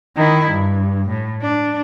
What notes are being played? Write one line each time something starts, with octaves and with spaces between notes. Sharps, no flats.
D#3 E4
G2
A2
D4